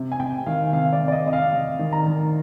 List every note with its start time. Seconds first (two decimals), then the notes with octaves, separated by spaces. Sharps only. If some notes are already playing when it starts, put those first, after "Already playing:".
Already playing: C3
0.12 G#5
0.20 C3 G5
0.46 D#3 F5
0.73 C3 F5
0.93 D5
0.99 C3
1.08 D5
1.12 D#5
1.26 C3 D#5
1.33 F5
1.53 C3
1.79 D#3
1.93 A#5
2.06 D#3